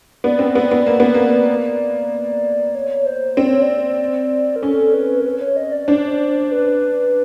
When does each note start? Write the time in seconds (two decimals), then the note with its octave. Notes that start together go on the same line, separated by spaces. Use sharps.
0.24 B3 D5
0.39 C4
0.55 B3
0.71 B3
0.86 A#3
1.00 B3
1.14 A#3
2.75 C#5
3.06 C5
3.37 C4 D5
3.49 C#5
3.62 D5
4.56 A#4
4.62 C#4 A4
4.94 B4
5.20 A#4
5.25 B4
5.41 C#5
5.57 D#5
5.72 D5
5.88 D4 C5
6.51 B4